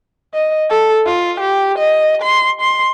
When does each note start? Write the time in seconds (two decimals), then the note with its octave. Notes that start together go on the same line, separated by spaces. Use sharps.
0.34 D#5
0.70 A4
1.06 F4
1.40 G4
1.79 D#5
2.22 C6
2.61 C6